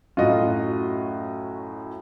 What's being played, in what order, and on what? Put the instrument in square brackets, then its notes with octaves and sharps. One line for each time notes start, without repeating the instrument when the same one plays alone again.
[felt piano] F#2 A2 [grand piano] F4 F#4 D#5